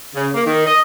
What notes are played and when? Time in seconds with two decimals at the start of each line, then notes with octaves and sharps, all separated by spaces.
0.15 C#3
0.34 A#3
0.47 D#3
0.66 D#5